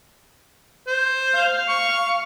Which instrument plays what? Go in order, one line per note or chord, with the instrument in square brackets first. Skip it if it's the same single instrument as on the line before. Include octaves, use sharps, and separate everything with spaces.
[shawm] C5
[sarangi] F5
[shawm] C#6